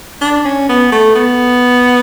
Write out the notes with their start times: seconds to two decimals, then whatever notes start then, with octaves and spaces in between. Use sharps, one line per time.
0.21 D4
0.45 C#4
0.69 B3
0.92 A3
1.15 B3